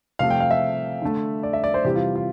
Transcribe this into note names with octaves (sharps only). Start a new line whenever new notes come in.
C3 F3 A3 F5
G5
F5
E5
D3 A3
D5
E5
D5
C5
C3 E3 G3 G4
F4
F4